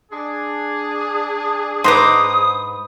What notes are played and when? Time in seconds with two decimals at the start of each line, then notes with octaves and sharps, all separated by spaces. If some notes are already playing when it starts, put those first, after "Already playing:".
0.12 D4 G#4
1.84 G#2 B4 C5 A#5 D6 D#6